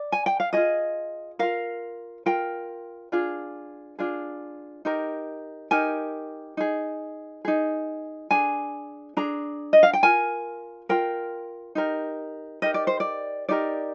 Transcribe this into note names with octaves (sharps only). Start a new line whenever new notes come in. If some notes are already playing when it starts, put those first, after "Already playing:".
Already playing: D5
G#5
G5
F5
F4 G#4 D#5
F4 A#4 F5
F4 A#4 G5
D4 F4 G#4
D4 F4 G#4
D#4 G4 A#4
D#4 G4 A#4 G#5
D#4 G#4
D#4 G#4
D4 G#4 G#5
D4 G#4 A#5
D#5
F5
G5
F4 A#4 G#5
F4 A#4 G5
D#4 G4 A#4
D#4 G4 A#4 D#5
D5
C5
D5
D#4 G4 A#4 D5